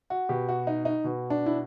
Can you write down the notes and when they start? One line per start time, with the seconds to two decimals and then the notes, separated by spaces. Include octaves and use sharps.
0.10 F#4
0.29 B2 G4
0.49 F#4
0.67 D#4
0.85 D#4
1.04 B2
1.30 D4
1.46 E4